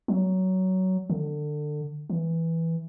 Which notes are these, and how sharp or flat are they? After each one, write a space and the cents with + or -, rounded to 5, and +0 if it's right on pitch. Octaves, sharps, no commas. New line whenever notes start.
F#3 +15
D3 +25
E3 -5